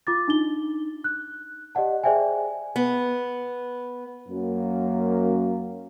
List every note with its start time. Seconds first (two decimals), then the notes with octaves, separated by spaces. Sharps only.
0.07 F4 D6 A6
0.28 D4 D#4 G7
1.04 F#6
1.75 G4 D5 D#5 F#5 A5
2.04 G#4 C5 D5 E5 G5 G#5
2.76 B3
4.29 F#2 A#3